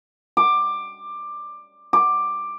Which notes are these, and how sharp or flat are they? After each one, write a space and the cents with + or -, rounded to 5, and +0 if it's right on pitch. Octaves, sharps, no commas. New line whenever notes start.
D6 +15
D6 +10